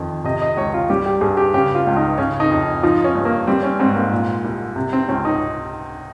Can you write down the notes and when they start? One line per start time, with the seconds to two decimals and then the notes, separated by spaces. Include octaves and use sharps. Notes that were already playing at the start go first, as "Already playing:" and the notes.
Already playing: F2 D#3
0.24 C3 D#5
0.42 D#5
0.57 C#2 C#5
0.74 F4
0.90 G3 G4
1.06 G4
1.21 G2 G#4
1.37 G4
1.54 C#3 G4
1.75 F4
1.87 C#2
1.96 D#4
2.18 C#3 C#4
2.40 D#4
2.51 F2
2.83 F3 D#4
3.04 C#4
3.15 G2
3.25 A#3
3.47 G3 C4
3.63 C#4
3.80 G#2 C4
3.96 A#3
4.12 A#2
4.45 C2
4.76 C3
4.93 C4
5.08 C#2 C#4
5.25 D#4